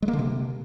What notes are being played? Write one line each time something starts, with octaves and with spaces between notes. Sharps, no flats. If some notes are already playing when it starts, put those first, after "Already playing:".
G#3
A#3
D3
C3